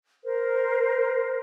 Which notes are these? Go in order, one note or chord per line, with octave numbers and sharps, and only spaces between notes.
A#4 C5